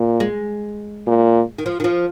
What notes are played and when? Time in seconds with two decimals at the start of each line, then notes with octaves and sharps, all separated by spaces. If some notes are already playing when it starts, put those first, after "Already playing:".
Already playing: A#2
0.20 G#3
1.07 A#2
1.58 D#3
1.66 F3
1.80 D#3
1.84 F3